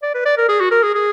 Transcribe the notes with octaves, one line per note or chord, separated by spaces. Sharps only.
D5
B4
D5
A#4
G#4
F#4
A#4
G#4
G#4